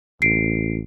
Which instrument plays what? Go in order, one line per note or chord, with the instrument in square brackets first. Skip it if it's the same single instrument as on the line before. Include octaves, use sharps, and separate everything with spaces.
[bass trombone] A1 [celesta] C7 D7